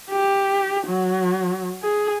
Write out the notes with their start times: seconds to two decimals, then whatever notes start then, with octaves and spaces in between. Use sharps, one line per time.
0.10 G4
0.87 F#3
1.83 G#4